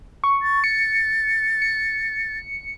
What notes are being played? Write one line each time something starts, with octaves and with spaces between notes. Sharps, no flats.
C#6
A6
C#7
C#7